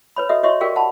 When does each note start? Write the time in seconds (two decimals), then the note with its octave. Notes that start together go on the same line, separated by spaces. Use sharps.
0.16 B4 C#5 B5
0.29 F#4 A4 D#5 E5
0.43 F#4 C#5 D#5 E5 C6 C#6
0.61 F#4 G4 A#4 D5 F5 G5
0.76 F#5 A5 B5